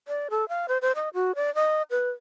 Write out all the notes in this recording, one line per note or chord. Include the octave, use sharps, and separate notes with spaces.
D5
A4
F5
C5
C5
D#5
F#4
D5
D#5
B4